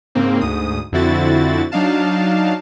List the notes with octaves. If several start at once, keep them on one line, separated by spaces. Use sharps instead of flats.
G#2 C#3 A#3 C4
D2 G#2 D#6
F2 D3 C4 E4 F#4 A6
F#3 D4 D#4 F5 A5